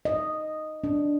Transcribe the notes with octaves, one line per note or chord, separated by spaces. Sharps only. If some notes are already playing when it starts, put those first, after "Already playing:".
D#5
D4